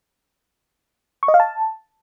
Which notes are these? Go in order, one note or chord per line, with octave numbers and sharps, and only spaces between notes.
C#6
D#5
F5
A5